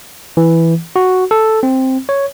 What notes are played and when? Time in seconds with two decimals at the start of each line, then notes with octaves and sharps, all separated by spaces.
0.37 E3
0.96 F#4
1.31 A4
1.63 C4
2.09 C#5